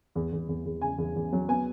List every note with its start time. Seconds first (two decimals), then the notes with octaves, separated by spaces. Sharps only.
0.15 E2
0.32 E2
0.49 E2
0.65 E2
0.81 C#3 G#5
0.98 E2
1.16 E2
1.33 F#3
1.48 B3 G#5